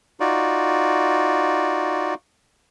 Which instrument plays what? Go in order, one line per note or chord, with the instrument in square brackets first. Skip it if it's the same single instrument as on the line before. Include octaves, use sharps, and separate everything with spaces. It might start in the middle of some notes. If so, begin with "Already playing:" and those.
[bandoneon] D#4 F4 F#4 D5